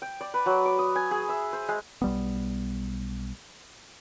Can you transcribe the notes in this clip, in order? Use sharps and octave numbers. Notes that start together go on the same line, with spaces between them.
G5
D5
B4
F#3
D6
D#6
G#5
G#4
E5
C5
G#3
B1 G3 B3